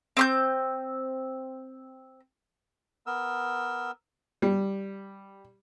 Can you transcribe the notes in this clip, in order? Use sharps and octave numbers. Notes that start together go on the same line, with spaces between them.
C4 C6 G6
B3 A#4 E6
G3